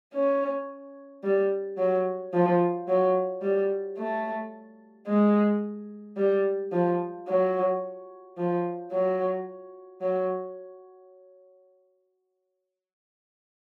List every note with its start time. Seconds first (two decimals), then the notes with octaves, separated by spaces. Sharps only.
0.14 C#4
1.23 G3
1.78 F#3
2.34 F3
2.88 F#3
3.42 G3
3.98 A3
5.07 G#3
6.17 G3
6.72 F3
7.28 F#3
8.37 F3
8.91 F#3
10.01 F#3